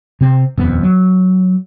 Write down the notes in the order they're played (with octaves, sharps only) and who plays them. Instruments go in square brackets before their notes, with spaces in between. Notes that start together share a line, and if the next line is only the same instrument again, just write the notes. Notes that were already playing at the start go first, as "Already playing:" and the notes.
[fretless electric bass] C3 C4
D#1 F2 B3
F#3